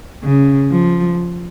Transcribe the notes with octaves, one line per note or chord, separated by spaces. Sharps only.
C#3
F3